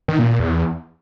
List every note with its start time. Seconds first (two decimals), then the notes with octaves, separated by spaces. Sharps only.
0.08 D#3
0.19 A#2
0.29 A#2
0.40 E2